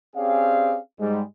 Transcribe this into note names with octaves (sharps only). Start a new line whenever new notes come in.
C4 C#4 G4 G#4 D5 F5
G#2 G3 G#3